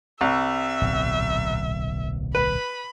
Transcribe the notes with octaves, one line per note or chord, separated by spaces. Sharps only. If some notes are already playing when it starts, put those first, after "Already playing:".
C2 E5
D1 B1 A#2
B4 B5